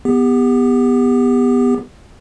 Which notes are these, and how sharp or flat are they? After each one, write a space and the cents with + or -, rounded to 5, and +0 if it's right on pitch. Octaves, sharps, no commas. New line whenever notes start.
B3 +0 G4 +30